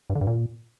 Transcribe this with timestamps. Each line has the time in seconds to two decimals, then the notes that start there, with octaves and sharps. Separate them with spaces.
0.10 G2
0.15 D3
0.21 G2
0.27 A#2